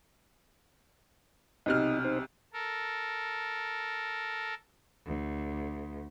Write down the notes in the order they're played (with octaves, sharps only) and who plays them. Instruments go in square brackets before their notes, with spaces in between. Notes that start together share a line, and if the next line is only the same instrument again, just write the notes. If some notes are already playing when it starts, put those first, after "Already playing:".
[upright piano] B1 C3 F6 [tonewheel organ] D#4 D#5
[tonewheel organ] D#4 C5
[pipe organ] A4 A#4
[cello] D2